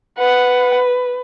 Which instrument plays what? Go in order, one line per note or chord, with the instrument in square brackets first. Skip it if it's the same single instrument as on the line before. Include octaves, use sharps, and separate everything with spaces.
[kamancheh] B4 [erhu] F#5